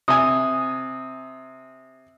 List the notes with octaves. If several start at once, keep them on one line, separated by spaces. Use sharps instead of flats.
C3 G#5 D#6